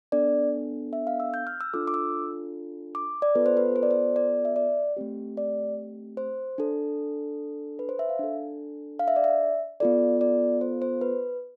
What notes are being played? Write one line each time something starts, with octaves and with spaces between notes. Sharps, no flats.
B3 D4 A4 D5
E5
F5
E6
G6
F6
E6
D4 F4 A4 D6
D6
E6
D6
D5
B3 F4 A4 B4
C5
B4
C5
D5
C5
D5
E5
D5
A3 C4 G4
D5
C5
D4 A4
B4
C5
E5
F5
D4 A4
F5
E5
D5
E5
B3 F4 A4 D5
D5
C5
C5
B4